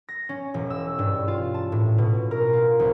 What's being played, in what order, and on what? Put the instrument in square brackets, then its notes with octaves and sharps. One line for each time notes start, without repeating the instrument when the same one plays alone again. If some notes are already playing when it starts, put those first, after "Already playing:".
[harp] A#6
C#4
E1
E6
G2
F4
A5
A2
B2
A#4
F4
C2